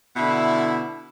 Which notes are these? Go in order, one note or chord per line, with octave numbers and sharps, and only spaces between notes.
B2 D3 E4